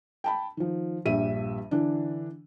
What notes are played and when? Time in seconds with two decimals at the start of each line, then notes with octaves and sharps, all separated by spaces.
0.24 G5 A5 B5
0.57 D#3 F3
1.05 A#1 G2 G3 E5 D#7
1.71 D3 E3 D4